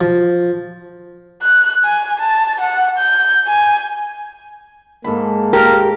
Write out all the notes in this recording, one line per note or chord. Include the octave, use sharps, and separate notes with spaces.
F3
F#6
G#5
A5
F#5
G6
G#5
G#2 A#3 A4 B5
G4 A#4